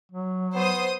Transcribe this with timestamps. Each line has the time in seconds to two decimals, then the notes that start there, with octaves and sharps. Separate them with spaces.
0.12 F#3
0.55 B3 C5 D#6